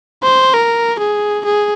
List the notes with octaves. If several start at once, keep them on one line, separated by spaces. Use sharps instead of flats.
C5
A#4
G#4
G#4